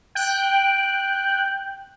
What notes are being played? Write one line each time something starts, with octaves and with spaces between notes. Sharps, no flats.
G5 F#6